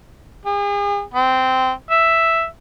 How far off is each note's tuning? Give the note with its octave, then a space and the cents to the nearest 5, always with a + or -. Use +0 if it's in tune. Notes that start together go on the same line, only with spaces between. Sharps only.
G#4 -40
C4 -15
E5 +0